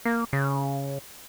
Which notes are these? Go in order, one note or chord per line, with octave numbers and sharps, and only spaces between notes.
A#3
C#3